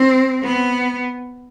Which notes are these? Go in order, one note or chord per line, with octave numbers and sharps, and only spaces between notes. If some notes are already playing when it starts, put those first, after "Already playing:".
Already playing: C4
B3